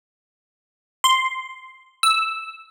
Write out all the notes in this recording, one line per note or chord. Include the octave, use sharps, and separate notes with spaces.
C6
E6